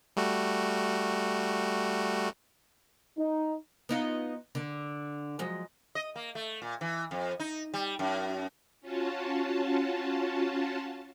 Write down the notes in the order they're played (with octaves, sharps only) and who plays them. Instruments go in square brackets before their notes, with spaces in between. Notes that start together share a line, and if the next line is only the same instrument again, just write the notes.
[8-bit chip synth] G3 A3 F#4
[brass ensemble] D#4
[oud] B3 D#4 F4
D3
F3 F#3 G#3
[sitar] D#5
A#3
A3
A#2
E3
F2
D#4
G3
F#2
[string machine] C#4 F4 F#4 A5